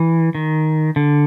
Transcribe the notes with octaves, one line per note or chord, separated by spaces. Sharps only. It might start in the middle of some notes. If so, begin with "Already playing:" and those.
Already playing: E3
D#3
D3